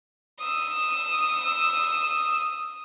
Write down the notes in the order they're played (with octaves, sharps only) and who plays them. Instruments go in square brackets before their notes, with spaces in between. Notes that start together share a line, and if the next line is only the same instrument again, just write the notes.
[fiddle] D#6 E6